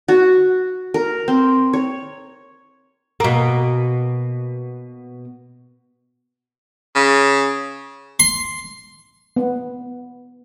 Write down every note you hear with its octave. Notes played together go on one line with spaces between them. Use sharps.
F#4
A#4
C4
C#5
B2 A#3
C#3
C6
B3